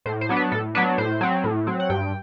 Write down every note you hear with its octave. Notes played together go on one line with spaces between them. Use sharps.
A2 C5
C5
F#3 B3 D4
B4
A2 A4
F#3 B3 D4 B4
A2 C5
F#3 C4
A2
F#3 C4
F#5
G2 G5